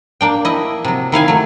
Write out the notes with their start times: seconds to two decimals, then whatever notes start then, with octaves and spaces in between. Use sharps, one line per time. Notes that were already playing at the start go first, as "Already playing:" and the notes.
0.21 A#3 D4 G5
0.45 E4 D#5
0.84 C3 F#3
1.12 D#3 E4 F5 G#5
1.28 F#3 A3